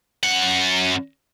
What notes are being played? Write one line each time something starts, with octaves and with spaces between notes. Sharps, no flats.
F#2 F#5